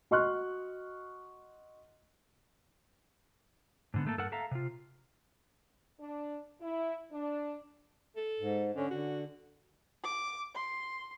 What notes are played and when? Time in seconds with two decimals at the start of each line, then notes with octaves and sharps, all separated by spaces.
0.11 F#4 D#5 C6 C#6 F6 F#6
3.94 G#2 D3 B3
4.06 A3 A#3 A4
4.18 G2 A4 A#4 F#5
4.32 A4 E5 F5 A#5
4.51 C3 F4
6.00 D4
6.61 E4
7.12 D4
8.16 A4
8.40 G#2
8.76 D3 C#4
8.90 D3 F#4
10.04 D6
10.55 C6